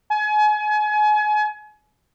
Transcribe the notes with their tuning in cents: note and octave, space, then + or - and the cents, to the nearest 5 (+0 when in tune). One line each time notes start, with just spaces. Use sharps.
G#5 +30